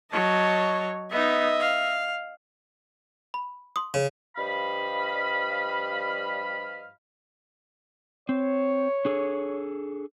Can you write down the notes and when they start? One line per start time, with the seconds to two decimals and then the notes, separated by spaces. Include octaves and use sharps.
0.12 F#3 C#5 D#5 A5
1.11 B3 D#4 D#5 E5
1.60 F5
3.34 B5
3.76 C6 D#6
3.94 C#3
4.37 G2 F3 G3 D#5 F5 B5
8.29 C4 C#5
9.05 D4 G#4 A4